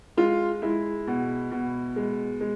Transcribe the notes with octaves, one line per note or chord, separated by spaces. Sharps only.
G#3 F4
G#3 E4
B2
B2
G#3
G#3